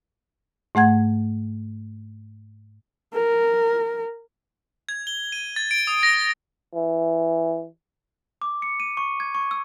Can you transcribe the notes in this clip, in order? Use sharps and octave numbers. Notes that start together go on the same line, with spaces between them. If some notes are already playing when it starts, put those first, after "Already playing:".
G#2 A3 F#5 G#6
A#4
G#6
G7
D#7
A6
D7
D#6
A#6
E3
D6
C#7
D#7
C#6
G#6
C#6
E6